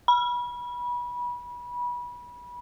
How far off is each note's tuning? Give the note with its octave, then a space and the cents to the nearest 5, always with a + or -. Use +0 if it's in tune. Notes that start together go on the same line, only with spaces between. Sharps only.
B5 -25